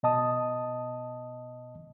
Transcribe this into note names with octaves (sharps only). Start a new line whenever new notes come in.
B2 D#5 A5 D#6